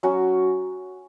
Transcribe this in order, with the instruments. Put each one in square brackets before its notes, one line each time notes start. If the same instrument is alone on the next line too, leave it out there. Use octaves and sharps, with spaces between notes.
[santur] F#3 C#4 F#4